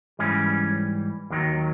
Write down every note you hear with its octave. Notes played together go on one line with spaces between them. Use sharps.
G#2 E3 G3 C#4
D#2 D#3 F#3